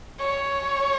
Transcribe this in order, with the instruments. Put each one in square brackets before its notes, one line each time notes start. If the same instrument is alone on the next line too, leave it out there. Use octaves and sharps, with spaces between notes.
[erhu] C#5